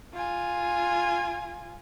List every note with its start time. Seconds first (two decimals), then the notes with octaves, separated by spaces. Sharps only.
0.13 F4 G#5